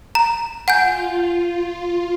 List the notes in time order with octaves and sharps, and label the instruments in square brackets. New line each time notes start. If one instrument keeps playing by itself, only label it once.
[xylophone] A#5
[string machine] F4 [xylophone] F#5 G#5 G6